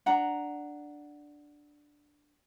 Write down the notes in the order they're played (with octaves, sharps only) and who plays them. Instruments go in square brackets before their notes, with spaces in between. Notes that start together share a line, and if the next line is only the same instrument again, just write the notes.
[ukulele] D4 F#5 A#5